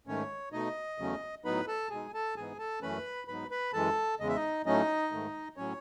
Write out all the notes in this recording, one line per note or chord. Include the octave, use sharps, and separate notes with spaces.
G#2 D#3 A3 C#4 C#5
B2 A3 D#4 D#5
E2 C#3 F#3 A3 C#4
A2 F#3 B3 D#4 B4 B5
A4 A5
B2 G#3 D#4 G#4 G#5
A4 A5
G#2 E3 B3 D#4 G#4 G#5
A4 A5
F#2 E3 A3 C#4 B4 B5
G#2 F#3 B3 D#4 B4 B5
B4 B5
F#2 E3 G#3 A4 A5
E2 C#3 G#3 D#5
E5
D#4 D#5
A2 F#3 A3 C#4 D#4 D#5
G#2 D#3 A3
A2 F#3 C#4 C#5